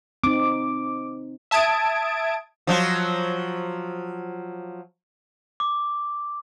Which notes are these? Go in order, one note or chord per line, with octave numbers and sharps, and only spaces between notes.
C4 D#4 D6
E5 A5 D#6 G#6 D7
F3 F#3 F4
D6